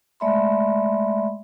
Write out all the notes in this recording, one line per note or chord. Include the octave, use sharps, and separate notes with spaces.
G#3 A3 D5 E5 B5 C6